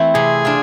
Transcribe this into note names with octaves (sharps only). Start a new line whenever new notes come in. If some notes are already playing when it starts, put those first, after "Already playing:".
Already playing: E3 A3 C4 E4
C3 G#4
D4 F4